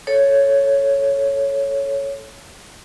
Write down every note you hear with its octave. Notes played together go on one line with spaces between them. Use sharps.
A4 C#5